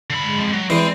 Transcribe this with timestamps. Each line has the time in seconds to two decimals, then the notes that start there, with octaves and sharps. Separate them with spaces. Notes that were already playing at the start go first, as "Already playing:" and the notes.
0.10 D3 B5
0.23 G#3
0.38 F3 C4
0.53 F#3
0.70 E3 G#3 C4 D5